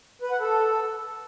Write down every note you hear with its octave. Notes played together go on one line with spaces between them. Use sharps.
B4
F#5
A4